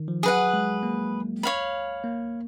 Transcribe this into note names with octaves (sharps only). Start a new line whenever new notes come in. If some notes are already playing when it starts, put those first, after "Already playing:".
Already playing: D#3
F3
F#3 G#4 B4 F#5
G#3
A#3
C#5 F5 B5
A#3